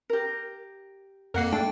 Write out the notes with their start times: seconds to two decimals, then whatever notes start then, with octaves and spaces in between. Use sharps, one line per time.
0.10 G4 A#4
1.34 F2 A#3 A#4 F#5 C7
1.52 A3 D4 A4 G5